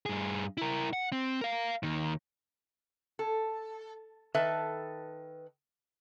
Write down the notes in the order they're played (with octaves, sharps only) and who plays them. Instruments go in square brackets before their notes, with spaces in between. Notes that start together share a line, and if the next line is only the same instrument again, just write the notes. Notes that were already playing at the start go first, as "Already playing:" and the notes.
[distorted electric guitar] G2 G#4
E4 A#4
F#5
C4
A#4 F5
D#2 D#3
[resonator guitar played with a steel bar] A4
D#3 A4 B4 E5 A5